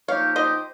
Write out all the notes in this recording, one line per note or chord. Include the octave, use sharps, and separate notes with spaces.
F3 A#3 D#4 G4 C#5 F5
C5 D#5